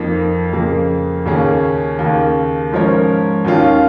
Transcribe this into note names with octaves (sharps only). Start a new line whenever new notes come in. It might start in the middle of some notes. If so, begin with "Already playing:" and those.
Already playing: F2 F3 A#3 D#4
F2 C#3 A#3
D#2 C#3 A#3 C#4 G#4
D#2 C#3 A#3
G#2 F3 C#4 A#4 C#5
D#2 D#3 C#4 F4